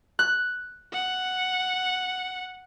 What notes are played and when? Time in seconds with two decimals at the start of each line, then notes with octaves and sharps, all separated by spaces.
0.19 F#6
0.93 F#5